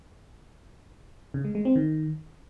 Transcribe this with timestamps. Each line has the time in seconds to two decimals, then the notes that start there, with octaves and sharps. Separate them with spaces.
1.34 C#3
1.45 G#3
1.55 G#3
1.65 C4
1.76 D#3